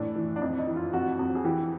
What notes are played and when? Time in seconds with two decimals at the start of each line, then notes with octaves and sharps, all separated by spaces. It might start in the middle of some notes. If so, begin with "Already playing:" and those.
Already playing: A2 E3 D4
0.16 E3
0.36 D4
0.41 F2 D#4
0.59 D#4
0.67 E3
0.76 F4
0.93 F2 F#4
1.19 F2
1.35 G#4
1.44 E3 G4